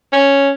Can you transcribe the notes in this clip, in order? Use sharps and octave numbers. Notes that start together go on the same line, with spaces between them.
C#4